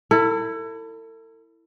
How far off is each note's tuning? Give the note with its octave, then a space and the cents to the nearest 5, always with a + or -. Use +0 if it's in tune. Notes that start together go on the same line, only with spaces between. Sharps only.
E4 +0 A4 +40